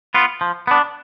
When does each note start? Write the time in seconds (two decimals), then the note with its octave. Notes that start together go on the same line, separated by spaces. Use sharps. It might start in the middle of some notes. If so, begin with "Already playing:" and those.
0.15 B3 F4
0.41 F3
0.67 B3 D4